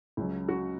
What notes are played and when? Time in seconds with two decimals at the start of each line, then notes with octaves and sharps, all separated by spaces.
0.17 C#2 C#3 F#3
0.49 F#4